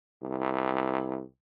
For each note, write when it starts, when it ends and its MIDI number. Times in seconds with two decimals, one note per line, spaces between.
0.23 1.24 36